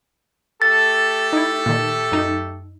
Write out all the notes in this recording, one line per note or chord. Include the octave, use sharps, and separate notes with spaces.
A3 G4 A4 A6
D#4 E4
A#2 D#3
F#2 D#4